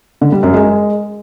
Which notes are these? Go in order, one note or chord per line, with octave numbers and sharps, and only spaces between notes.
D3
G3
F#2
G#3